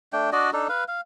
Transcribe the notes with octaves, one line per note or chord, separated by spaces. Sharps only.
A3 D4 G5
D4 F#4 D5 D#5
D4 D#4 A4
B4 F5
F5